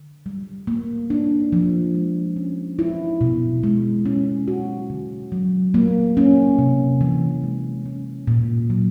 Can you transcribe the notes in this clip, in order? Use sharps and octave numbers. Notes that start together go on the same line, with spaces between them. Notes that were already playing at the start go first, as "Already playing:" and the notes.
Already playing: D3
G3
A#3
D4
F3
G#3
C#4
E4
B2
G#3
C#4
F#4
D3
F#3
A#3
C#4
C3
E3
G#3
C#4
A#2
F#3